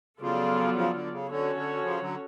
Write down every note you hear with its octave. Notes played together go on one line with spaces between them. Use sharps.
C#3 F3 F#3 B3 F4 A4 D5
C#3 F3
D3
C#3
D3 C#4 F#4 A4 C#5
D3
C#3 F3
D3 F#3